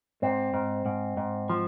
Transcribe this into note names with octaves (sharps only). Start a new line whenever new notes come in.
G#2 C4
G#2
G#2
G#2
F3